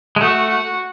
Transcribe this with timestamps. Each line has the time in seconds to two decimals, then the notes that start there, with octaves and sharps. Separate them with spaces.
0.16 G#3
0.20 A3 F#4
0.49 F#4